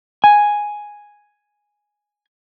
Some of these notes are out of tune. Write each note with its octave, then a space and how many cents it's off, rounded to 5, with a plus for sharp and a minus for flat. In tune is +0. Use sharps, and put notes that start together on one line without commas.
G#5 +0